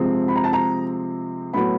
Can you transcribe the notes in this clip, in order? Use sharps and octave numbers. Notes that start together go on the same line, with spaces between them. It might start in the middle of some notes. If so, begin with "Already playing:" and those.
Already playing: C3 F3 G#3 C4
B5
A#5
A5
A#5
A2 F#3 B3 B5